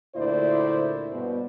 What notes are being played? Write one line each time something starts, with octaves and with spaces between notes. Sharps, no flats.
D2 A#2 E4 C5 D5
G2 B2